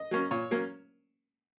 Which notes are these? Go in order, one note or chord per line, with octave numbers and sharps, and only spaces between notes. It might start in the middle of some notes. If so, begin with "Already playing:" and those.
Already playing: D#5
F#3 A#3 C#4
A#2 C#5
F#3 A#3 C#4